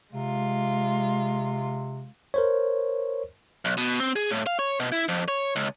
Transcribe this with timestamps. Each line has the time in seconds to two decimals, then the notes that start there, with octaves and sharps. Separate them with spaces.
0.13 C3 G#3 F4
2.34 A#4 C5 C#5
3.65 B1
3.77 B2
4.00 C4
4.16 G#4
4.31 A2
4.47 F5
4.59 C#5
4.80 B2
4.92 E4
5.09 F2
5.28 C#5
5.56 C#2